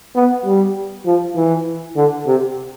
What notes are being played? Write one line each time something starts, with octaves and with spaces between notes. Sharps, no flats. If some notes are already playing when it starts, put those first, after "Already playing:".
B3
G3
F3
E3
D3
C3